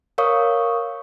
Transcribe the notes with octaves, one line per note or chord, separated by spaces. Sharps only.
A#4 C#5 F5 C#6 D#6